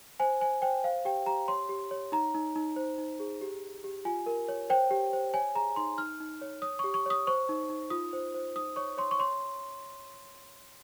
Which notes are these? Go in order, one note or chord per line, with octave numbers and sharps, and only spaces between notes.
C5 G#5
C5 G#5
C5 G5
C5 F5
G4 G5
G4 A#5
C#5 C6
G4
C#5
D#4 A#5
D#4
D#4
C5
D#4
G#4
G4
G4
G4
F4 G#5
A#4
C#5
C5 G5
G4
C5
C#5 G#5
G#4 A#5
D#4 C6
D#4 F6
D#4
C#5
C#5 D#6
G4 C#6
C#6
C#5 D#6
C5 C#6
D#4
D#4
F4 D#6
C5
C5
D#4 D#6
C#5 C#6
C#5 C6
C#6
C#5 C6